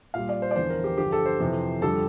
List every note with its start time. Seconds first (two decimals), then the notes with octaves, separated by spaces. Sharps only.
0.14 A#2 G3 F5
0.29 D5
0.42 C5
0.51 D5
0.56 E2 D3 F3 C5
0.70 A#4
0.84 G4
0.98 G2 D3 F3 G4
1.12 A4
1.26 C5
1.40 F2 C3 E3
1.81 F2 D3 G3 A4